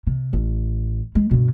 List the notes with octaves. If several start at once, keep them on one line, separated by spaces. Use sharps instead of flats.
C3
A1
G#3
G2 B2